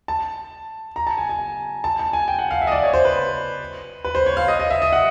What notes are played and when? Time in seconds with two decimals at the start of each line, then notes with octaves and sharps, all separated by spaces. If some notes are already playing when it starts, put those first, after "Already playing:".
0.08 A5
0.96 A#5
1.07 A5
1.18 G#5
1.29 G#5
1.84 A5
1.99 A5
2.13 G#5
2.28 G5
2.39 F#5
2.51 F5
2.62 E5
2.67 D#5
2.72 D5
2.83 C#5
2.93 C5
3.05 B4
4.05 B4
4.15 C5
4.26 C#5
4.37 F5
4.48 D#5
4.60 D#5
4.70 E5
4.82 D#5
4.93 F#5